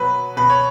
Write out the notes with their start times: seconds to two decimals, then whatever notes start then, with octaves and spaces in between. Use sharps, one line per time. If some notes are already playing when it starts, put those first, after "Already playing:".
Already playing: B2 F#3 B4
0.37 B2 B4
0.50 C#5